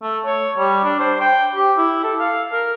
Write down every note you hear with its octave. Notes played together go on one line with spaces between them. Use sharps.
A3
C#5
G3
D4
C5
G5
G4
E4
A4
F5
A#4